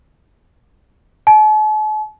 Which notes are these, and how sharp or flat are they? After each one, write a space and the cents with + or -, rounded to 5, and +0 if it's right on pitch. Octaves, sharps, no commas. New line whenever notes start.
A5 -45